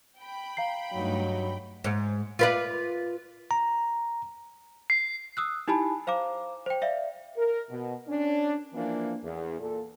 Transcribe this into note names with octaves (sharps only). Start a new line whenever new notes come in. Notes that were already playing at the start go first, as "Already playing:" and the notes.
G5 B5
F5 A#5 C7
G2 F#3 A3 D#4
G#2
F4 B4 D5
A#5
C7
D#6 E6 F#6
D#4 E4 G4 G#5 A5 B5
C5 F5 A#5 D6
C5 G5
D5 E5 F5
A#4
B2
C#4 D4
E3 F3 A#3 D4
E2
A#2 A4